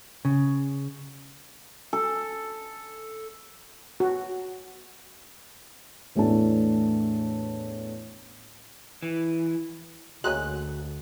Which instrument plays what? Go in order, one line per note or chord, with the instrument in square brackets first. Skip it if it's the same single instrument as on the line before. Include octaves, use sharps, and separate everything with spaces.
[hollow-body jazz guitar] C#3
[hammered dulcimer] A4
[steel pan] F#4
[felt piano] E2 A2 A3 B3 D4 A5
[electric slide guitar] E3
[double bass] D2 [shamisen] G#3 A#3 C#4 [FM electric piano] F#4 [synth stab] F#6